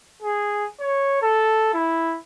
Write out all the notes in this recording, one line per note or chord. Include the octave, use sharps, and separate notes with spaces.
G#4
C#5
A4
E4